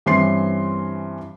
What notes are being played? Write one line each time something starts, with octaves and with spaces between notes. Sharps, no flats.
G2 E3 C4 C#4 C6 C7